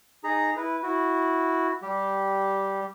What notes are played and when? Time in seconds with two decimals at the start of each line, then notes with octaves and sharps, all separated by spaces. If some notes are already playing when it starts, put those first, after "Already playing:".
0.24 D#4 G#4 A#5
0.57 E4 B4
0.83 E4 F#4
1.82 G3 G4